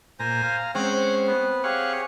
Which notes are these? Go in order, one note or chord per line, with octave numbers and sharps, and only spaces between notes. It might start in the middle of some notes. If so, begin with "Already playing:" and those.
A#2 C5 G#5 A#5
F5 A#5
G#3 C4 C#4 C#5 F#5
B3 B4
G4 G#4 C#5 F5 F#5 C#6